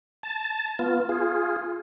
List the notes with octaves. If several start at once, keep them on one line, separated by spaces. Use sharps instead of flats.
A5
B3 F4
F4 G#4